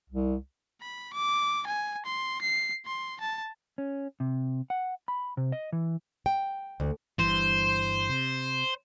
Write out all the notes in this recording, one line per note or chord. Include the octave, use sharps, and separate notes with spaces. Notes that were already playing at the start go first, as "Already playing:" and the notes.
C2
B5
D6
G#5
C6
C7
C6
A5
C#4
C3
F#5
B5
C3
D#5
E3
G5
D2
G1 G2 E3 C5
C3